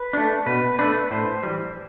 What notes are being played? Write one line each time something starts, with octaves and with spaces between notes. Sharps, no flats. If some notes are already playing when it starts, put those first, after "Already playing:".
Already playing: B4
A3 D4
B2 B4
A3 D4 B4
A2 C5
E3 G3